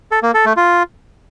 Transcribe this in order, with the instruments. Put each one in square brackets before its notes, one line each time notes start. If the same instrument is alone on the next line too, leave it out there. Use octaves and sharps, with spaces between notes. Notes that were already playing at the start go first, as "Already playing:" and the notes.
[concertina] A4
A#3
A4
A3
F4